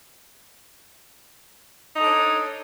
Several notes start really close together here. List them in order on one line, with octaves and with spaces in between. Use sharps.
D#4 A4 D4 C#5